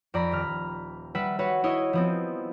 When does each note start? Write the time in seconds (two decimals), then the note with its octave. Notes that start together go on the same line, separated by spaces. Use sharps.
0.14 F2 D5 A#5 B5
0.32 D#1 F6
1.15 G3 B4 E5 F#5 B6
1.39 F#4 B4 C#5 F#5
1.64 E4 C#5 D#5
1.93 F3 B3 C4